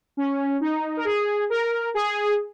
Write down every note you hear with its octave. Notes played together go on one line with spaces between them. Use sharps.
C#4
D#4
A#4
G#4
A#4
G#4